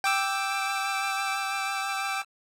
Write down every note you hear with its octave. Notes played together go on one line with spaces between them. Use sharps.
G5 D6 E6